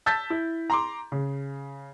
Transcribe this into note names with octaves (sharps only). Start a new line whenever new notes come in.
A5 E6 G6 A6 B6
E4
A#5 C6 D6
C#3